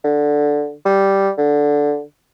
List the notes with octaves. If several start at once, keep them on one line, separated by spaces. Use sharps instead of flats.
D3
G3
D3